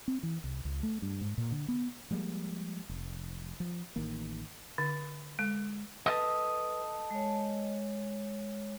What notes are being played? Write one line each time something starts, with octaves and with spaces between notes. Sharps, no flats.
C4
E3
C2
C#2
A3
G2
G#2
A#2
D3
B3
F3 G3 G#3 A#3
F1
F3
A1 D#3 A#3
D3
G#3
A4 B4 D#5
G#3 C#5